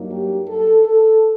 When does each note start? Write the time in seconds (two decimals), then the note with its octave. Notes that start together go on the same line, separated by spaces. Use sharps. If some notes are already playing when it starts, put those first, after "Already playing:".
Already playing: G2 F#3 A#3 D#4
0.11 G4
0.48 A4
0.84 A4